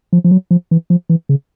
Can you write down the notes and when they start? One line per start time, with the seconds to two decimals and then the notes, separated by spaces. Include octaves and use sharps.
0.13 F3
0.24 F3
0.31 F#3
0.51 F3
0.71 E3
0.90 F3
1.09 E3
1.29 C#3